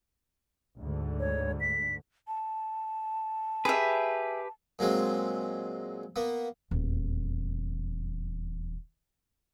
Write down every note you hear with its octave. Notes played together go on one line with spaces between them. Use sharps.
D2 G#2 D3
C#5
B6
A5
G4 G#4 B4 E5
A#2 F#3 G#3 C4
A#3 B3
D#1 E2